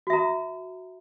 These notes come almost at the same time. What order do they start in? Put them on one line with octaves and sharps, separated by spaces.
F#4 E5 A#5